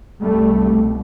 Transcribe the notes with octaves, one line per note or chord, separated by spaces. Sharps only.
C2 B2 G3 A3